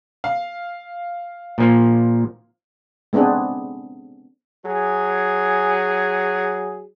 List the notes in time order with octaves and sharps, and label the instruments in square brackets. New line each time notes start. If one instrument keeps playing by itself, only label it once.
[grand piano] F5
[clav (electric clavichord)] A#2 F3 A#3
[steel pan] G#3 B3 C4 D4 G#4
[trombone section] F#3 G#4